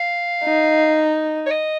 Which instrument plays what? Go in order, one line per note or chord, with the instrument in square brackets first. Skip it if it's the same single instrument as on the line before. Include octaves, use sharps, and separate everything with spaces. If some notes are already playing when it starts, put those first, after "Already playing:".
Already playing: [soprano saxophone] F5
[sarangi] D#4
[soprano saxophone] C#5
D#5